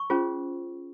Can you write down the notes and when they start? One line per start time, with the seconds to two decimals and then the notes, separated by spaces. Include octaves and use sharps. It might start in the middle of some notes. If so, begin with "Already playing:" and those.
Already playing: C#6
0.10 C#4 F4 G#4 C5